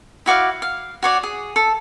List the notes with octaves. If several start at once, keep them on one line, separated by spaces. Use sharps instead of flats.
E4 F#4 D5 F5
F5
F#4 C#5 D5
G#4
A4